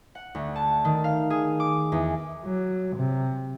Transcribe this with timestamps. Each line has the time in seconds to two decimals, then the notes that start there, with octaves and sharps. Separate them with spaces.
0.15 F#5
0.35 D2
0.56 A5
0.85 D#3
1.04 F5
1.30 G#4
1.60 D6
1.92 E2
2.45 F#3
2.96 C3